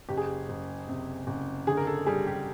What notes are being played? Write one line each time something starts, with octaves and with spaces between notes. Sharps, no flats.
F#1 G4
G#4
G4
F#1
C3
F#1
D3 G#4
A#4
A4
G3 G#4
G4